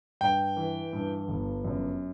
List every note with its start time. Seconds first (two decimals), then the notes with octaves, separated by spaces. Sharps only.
0.21 G2 G5
0.57 E3
0.93 G2
1.28 G1
1.65 F#2